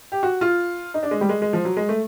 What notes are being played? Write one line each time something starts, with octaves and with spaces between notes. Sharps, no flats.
G4
F#4
F4
D#4
D4
G#3
G3
G#3
G#3
F3
F#3
G#3
A3